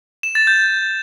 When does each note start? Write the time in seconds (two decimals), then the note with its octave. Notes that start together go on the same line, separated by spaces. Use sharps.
0.23 E7
0.35 A6
0.47 G6